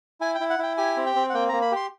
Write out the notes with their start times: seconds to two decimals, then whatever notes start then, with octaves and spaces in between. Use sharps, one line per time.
0.21 E4 G#5
0.35 G5
0.40 E4
0.50 F#5
0.59 E4 G5
0.77 G4 G#5
0.97 C4
1.06 G5
1.16 C4
1.30 F#5
1.34 A#3 G5
1.49 A#3 A#5
1.62 B5
1.72 G4 C6